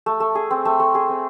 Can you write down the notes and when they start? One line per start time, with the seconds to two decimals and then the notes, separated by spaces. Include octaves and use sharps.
0.06 A3
0.20 A3
0.35 G#4
0.50 C4
0.65 A3
0.80 A3
0.95 G#4
1.09 C4